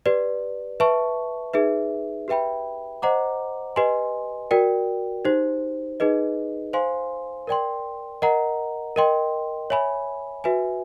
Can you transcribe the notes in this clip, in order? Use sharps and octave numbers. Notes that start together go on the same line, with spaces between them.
G4 B4 D5
B4 E5 A5 C#6
D#4 G#4 B4 E5
G4 B4 E5 G5 B5
C5 D#5 F#5 A#5 D6
G4 B4 D#5 G#5 C6
F#4 A#4 D5 G5
D#4 G4 C5
D#4 G#4 B4 D#5
C5 F5 G#5 C6
A#4 D5 G5 C6
A#4 D#5 F#5 A#5
A#4 D#5 G5 C6
C#5 E5 G#5 B5
F#4 B4 E5 G#5